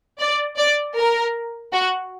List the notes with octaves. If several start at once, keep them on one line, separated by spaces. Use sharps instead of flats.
D5
D5
A#4
F#4